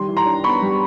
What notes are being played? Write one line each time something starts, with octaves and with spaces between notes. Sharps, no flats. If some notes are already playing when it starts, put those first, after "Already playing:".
Already playing: D#3 G3 C6
E3
A#5 C6
D4
B3 B5 C#6
G3